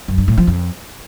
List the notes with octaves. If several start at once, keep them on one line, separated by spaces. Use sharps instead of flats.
F#2
G2
A2
F3
F2